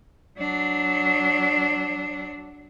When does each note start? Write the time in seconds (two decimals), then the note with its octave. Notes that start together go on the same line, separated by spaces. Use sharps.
0.38 F#3 D4